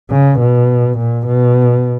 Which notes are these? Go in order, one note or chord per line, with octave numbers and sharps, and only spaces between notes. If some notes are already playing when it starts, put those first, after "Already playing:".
C#3
B2
A#2
B2